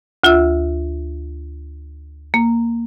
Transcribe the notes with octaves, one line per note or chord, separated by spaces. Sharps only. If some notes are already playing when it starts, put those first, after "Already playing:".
D2 F4 E5 E6
A#3